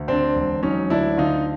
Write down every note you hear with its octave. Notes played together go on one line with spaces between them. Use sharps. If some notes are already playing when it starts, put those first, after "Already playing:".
Already playing: D2
D3 C4 D4
E1
F#3 C#4 D#4
D2 D4 E4
D3 D#4 F4